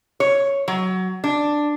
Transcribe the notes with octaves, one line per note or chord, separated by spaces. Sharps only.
C#5
F#3
D4